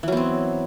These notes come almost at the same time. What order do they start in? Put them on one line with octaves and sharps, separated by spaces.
E3 F#3 B3 C4